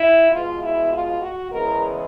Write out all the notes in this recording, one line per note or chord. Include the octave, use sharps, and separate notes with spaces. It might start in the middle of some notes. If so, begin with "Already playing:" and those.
Already playing: E4
B2 G#3 B3 F4
E4
F4
F#4
E2 C#3 E3 G#3 B3 A#4